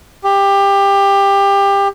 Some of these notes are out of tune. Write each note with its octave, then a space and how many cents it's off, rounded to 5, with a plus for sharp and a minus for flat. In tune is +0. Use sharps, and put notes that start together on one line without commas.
G4 +20